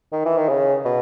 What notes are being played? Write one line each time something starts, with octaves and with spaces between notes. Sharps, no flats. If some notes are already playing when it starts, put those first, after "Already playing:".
D#3
E3
D#3
C#3
B2